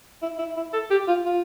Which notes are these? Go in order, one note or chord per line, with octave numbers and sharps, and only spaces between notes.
E4
E4
E4
A4
G4
F4
F4